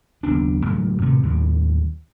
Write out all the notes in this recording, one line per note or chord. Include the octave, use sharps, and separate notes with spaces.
F#1 D#2 B3 D4
F#2 A2 D3 F3
A2 C3 D#3 A3
D#2 A2 G3